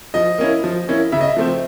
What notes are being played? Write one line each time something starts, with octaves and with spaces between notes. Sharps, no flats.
F3 D#5
A#3 C#4 E4
F3
A#3 C#4 E4
C#3 E5
D#5
E5
F3 A3 C4